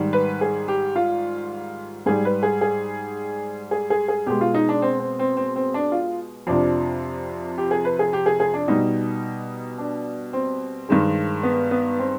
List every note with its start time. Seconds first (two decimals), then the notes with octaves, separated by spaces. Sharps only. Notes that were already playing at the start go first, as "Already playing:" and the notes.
Already playing: G#2 D#3 G3
0.13 B4
0.41 G#4
0.68 G4
0.96 F4
2.06 G#2 G3 G#4
2.25 B4
2.43 G#4
2.61 G#4
3.71 G#4
3.90 G#4
4.08 G#4
4.27 B2 G#3 G4
4.41 F4
4.54 D#4
4.69 D4
4.82 C4
5.00 C4
5.19 C4
5.37 C4
5.56 C4
5.74 D4
5.92 F4
6.47 F2 C3 F3 D4
7.58 G4
7.71 G#4
7.85 B4
7.99 G#4
8.13 G4
8.26 G#4
8.40 G#4
8.54 D4
8.68 B2 G3 D#4
9.78 D4
10.33 C4
10.89 G2 D#3 G#3
11.43 B3
11.71 B3
11.99 C4